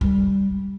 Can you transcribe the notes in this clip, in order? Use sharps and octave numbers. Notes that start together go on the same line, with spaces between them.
G3